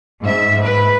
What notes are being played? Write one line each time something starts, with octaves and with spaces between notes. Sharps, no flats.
G#2 E5
B4